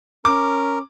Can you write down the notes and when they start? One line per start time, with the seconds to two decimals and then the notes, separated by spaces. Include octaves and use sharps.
0.25 C#4 A#4 D6